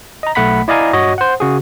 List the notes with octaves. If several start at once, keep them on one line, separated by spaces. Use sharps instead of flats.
D#5 A#5
B1 A3 F#5 B5 B6
E4 D5 D#5 F5 G#5 A#5
G2 F#4 C#5 D#5
C5 F#5
C#3 F#4 G#4